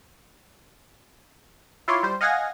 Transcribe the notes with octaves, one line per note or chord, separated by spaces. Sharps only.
E4 F4 C#5 C6 D6
G3 C5
D#5 F5 F#5 G#5 G#6 A#6